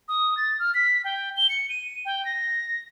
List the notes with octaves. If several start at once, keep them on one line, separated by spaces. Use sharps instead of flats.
D#6
A6
F6
B6
G5
G7
C#7
D#7
G5
A#6